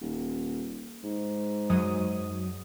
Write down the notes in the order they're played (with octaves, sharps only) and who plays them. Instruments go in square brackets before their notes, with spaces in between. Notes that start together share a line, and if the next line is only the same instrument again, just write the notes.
[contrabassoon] D#1
G#2
[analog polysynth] F#2 F#3 D#6